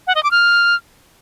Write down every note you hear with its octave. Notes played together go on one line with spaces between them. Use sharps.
F#5
D#5
D6
F6